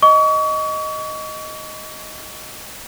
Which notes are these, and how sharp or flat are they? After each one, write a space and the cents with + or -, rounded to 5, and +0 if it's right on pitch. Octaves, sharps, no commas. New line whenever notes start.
D#5 +0 C#6 +40